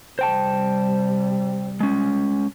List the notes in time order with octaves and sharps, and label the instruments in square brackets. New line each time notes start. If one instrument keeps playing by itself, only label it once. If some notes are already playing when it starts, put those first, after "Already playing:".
[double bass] C3 G3 [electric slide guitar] C5 G5 A5
[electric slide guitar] G#3 C#4